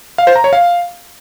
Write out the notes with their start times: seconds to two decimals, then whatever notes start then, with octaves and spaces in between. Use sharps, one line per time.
0.18 F5
0.27 C5
0.36 A#5
0.44 C#5
0.53 F5